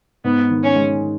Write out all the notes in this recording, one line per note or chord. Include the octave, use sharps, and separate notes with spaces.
G#2 B3
D#3
C#4
G#3